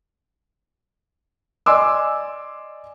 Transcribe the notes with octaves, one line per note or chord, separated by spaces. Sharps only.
D5 D#5 G#5 C6 D6 E6